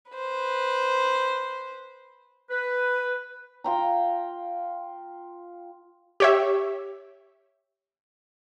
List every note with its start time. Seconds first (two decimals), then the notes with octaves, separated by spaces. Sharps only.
0.11 B4 C5
2.50 B4
3.64 F4 G5 A#5
6.20 G4 C#5 E5